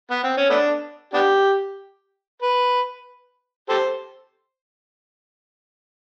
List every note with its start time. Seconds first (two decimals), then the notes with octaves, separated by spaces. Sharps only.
0.10 B3
0.24 C4
0.37 C#4
0.50 A3 B3 D4
1.14 B3 D4 G4
2.42 B4
3.69 G4 A4 C5